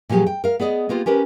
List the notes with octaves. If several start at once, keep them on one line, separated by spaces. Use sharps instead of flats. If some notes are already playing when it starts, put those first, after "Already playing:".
A#2 F3 F#3 G4 G#4
G5
A#4 F5
B3 G#4 D5 D#5
A#3 B3 F4 G4
C#4 G4 A#4 B4